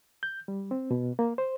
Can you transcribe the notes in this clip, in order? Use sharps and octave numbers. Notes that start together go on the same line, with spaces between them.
G6
G3
C4
B2
A#3
C5